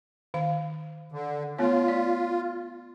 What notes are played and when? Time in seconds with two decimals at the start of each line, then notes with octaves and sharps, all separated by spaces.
0.34 D#3 F5
1.12 D3
1.58 A3 B3 F4 C#5
1.88 D5